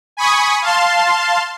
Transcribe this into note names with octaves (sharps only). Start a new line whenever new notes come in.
G#5 B5 C#6 D#6
F5 A5 C6